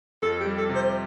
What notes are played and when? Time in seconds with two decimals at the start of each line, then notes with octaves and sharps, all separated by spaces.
0.22 F2 A4
0.40 G4
0.46 G3
0.58 A4
0.69 C3
0.75 C5